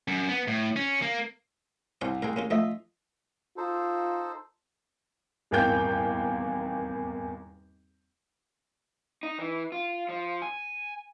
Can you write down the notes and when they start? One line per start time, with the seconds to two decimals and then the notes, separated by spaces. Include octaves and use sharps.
0.08 F#2
0.29 B3
0.48 A2
0.76 C#4
1.02 A#3
2.01 C2 C5 C#5 F5
2.22 G#3 A3 A#4 F5 G5
2.36 A#3 C#4 F4
2.51 F3 A3 F4 D#5 E5
3.57 D#4 F4 A4 C5
5.51 D#1 G#1 E2 A#3 G5 G6
9.23 D#4
9.39 E3
9.72 F4
10.09 F3
10.42 G#5